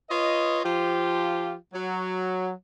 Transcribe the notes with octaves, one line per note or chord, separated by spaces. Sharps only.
F4 B4 C#5 D#5
F3 F4 G4
F#3